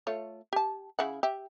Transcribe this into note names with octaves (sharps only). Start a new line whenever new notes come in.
A3 F4 C#5
G4 A5
C#3 E4 F#5
G4 E5